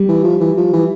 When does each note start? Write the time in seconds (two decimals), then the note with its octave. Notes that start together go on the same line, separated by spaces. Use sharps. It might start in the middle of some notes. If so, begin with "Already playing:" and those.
Already playing: G3
0.09 E3
0.24 F3
0.41 E3
0.58 F3
0.73 E3